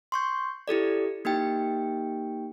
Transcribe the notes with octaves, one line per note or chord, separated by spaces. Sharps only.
C6 C#6 G6
E4 G4 A4 D5
A#3 D#4 G4 G5